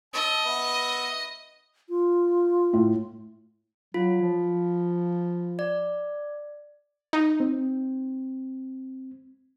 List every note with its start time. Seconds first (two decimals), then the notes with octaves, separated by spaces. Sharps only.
0.14 D#5 A5 E6
0.46 B3 B4 E5
1.90 F4
2.73 A2
3.94 F#3 F4
4.21 F3
5.59 D5
7.13 D#4
7.40 C4